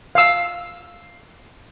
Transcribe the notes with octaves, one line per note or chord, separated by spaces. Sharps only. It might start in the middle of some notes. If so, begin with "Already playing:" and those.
F5 E6